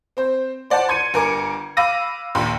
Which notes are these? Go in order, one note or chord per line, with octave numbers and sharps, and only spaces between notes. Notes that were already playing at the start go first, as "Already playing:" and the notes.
C4 C5
C5 D5 F#5 A5
C6 G#6 C#7 D#7
G1 A#4 G#5 D6 C#7
F5 B5 D6 E6 A#6 D#7
A#1 D#2 C6